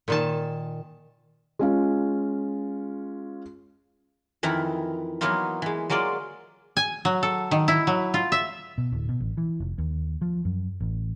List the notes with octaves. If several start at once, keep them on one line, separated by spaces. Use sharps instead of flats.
A#2 D#3 A5
G#3 C#4 F4
F2 D#3 E3 E4 A#5
E3 F#3 A#3 B3 D#4 F4
E3 G#3
F#3 G#3 A#3 F4 D5 D#5
G#5
F#3
A4
D#3
E4
F#3
F4
E5
B2
D1
B2
A1
E3
F1
D#2
F3
F#2
A1